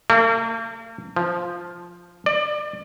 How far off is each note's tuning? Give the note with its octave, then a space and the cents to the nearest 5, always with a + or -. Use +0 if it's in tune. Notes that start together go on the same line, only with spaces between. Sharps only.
A#3 -45
F3 +0
D5 +30